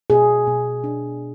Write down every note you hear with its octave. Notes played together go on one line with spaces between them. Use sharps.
B2 G#4
B2
D4